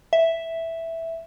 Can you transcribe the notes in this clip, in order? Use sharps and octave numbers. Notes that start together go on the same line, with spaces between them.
E5